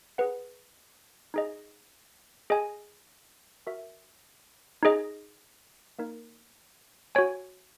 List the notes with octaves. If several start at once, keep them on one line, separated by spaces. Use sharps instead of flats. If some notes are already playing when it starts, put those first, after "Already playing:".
G#4 B4 F#5
D#4 G#4 D#5
G#4 D#5 G#5
F#4 A#4 E5
D#4 G#4 D#5
A#3 D#4 A#4
F#4 C#5 G#5